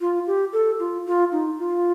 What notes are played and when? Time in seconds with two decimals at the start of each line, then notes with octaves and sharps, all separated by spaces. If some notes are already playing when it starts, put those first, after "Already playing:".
0.01 F4
0.27 G4
0.53 A4
0.79 F4
1.06 F4
1.32 D#4
1.59 F4